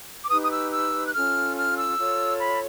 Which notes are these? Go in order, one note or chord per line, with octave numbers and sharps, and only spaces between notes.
D6
D#4 G4 B4 D#6
D#6
E6
E6
F#6
C#4 F4 A4 F6
F6
E6
F4 A4 C#5
B5